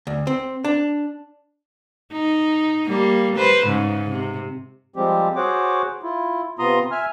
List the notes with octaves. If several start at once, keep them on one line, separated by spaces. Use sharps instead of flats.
D2
C4
D4
D#4
G3 A#3
B4 C5
G#2 C#3
C3
F3 G3 G#3 C4 G4
F#4 G#4 C5 C#5 F#5 D6
E4 F4
C3 B3 F4 A#5 C6 D#6
E5 G#5 F6